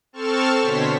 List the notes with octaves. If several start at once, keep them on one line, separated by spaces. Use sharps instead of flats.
C4 A4 A5 C#6 F6 E7
B2 D3 C5 C#5 B6